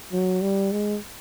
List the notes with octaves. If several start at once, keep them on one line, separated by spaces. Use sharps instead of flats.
F#3
G3
G#3